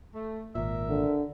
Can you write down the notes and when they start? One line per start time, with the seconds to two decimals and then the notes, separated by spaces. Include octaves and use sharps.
0.14 A3
0.55 G#1 A#2 A#4 E5
0.89 D3